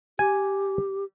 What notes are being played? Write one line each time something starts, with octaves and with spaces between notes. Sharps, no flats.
G4 G#5